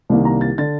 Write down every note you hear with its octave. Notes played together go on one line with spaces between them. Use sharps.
C2 C3 D#3 G3 A#3
A#5
A6
D3 A6